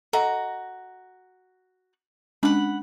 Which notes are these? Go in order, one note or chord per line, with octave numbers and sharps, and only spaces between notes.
F#4 A4 D#5 A#5
G#3 C#4 D4 F#5 B5